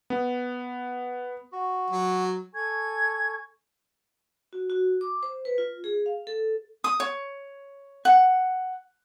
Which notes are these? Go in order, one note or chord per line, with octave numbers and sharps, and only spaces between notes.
B3
F#4
F#3
A4 G#5 C#6 G#6
F#4
F#4
D6
C5
B4
F4
G#4
F5
A4
D#6
C#5
F#5